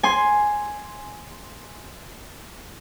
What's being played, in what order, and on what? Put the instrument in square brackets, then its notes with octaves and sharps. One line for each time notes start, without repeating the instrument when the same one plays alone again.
[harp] G#5 C6